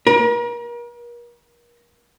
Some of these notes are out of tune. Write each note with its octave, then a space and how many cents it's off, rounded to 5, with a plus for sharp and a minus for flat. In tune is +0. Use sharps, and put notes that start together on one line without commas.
A#4 +40